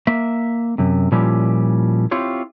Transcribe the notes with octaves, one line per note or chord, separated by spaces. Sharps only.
A#3 E5
F#2 C3
A#2 F3 G3 C#4 E4 G4
C4 E4 F4 G4 C#5